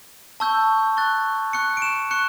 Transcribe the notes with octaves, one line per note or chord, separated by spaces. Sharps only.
A5 C#6 E6 G6
C#6 F#6 A6
C#6 F#6 C#7
D7
E7
C#6 F#6 C#7